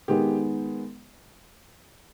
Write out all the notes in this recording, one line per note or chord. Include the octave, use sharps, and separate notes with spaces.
D#3 G#3 B3 G4